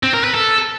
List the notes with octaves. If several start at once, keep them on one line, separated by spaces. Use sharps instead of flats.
C4
A#4
B4
A4